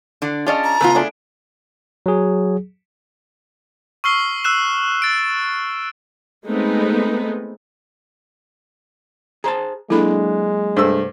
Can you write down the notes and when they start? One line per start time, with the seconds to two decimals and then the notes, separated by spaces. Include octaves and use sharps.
0.22 D3 D4
0.47 C#4 F4 G#4 D5 D#5 A5
0.64 A#5
0.81 C#3 A3 B3 F4 A4 B4
0.95 A3 D4 G#4
2.06 F#3 G#4
4.04 C#6 E6 F6 C7 G7
4.44 E6 F#6 E7
5.02 A6 D7
6.46 G#3 A3 B3 C4 D#4 B4
9.44 G#4 C5 A5 A#5
9.90 F#3 G#3 A#3 D4 E4 A4 B5
10.77 C2 G2 A3 C5 E6